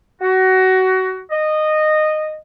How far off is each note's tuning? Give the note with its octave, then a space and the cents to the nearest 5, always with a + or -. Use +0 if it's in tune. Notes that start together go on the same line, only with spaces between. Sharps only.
F#4 +20
D#5 -15